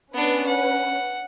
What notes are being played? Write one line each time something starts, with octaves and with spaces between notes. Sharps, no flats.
B3 C#4 D4 B4
F#5